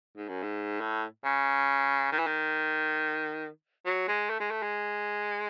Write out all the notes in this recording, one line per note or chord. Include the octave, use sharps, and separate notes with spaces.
G#2
F#2
G#2
A2
C#3
D#3
E3
D#3
F#3
G#3
A3
G#3
A3
G#3